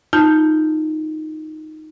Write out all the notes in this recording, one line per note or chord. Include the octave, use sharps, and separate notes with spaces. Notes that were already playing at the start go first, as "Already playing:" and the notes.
D#4 F4 A5 G6